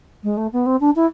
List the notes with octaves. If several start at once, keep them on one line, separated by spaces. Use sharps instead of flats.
G#3
A3
B3
C4
D4
E4